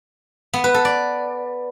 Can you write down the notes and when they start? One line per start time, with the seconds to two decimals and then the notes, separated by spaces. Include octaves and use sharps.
0.53 B3
0.64 B4
0.74 A4
0.85 D5